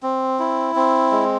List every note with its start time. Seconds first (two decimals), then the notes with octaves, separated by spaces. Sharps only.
0.03 C4
0.39 E4
0.76 C4
1.11 G#3